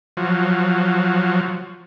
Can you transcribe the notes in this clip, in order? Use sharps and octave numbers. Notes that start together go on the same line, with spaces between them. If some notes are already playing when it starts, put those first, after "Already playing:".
F3 F#3